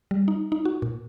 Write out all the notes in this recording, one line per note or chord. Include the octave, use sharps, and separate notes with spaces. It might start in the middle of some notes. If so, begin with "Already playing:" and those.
G3
D#4
D#4
F#4
A#2